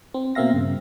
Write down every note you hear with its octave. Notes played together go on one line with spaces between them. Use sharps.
C4
B2 A#3 C4 E5 F5 A#6
G2 C#3